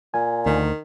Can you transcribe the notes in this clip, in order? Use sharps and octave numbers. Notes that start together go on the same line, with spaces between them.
A#2 G#5
D2 D#3